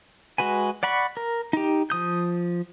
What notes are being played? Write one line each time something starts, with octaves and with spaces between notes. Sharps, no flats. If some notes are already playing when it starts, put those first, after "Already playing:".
G#3 F#4 B4 G#5
D5 F#5 B5 C#6
A#4
D#4 G4
F3 D#6 G6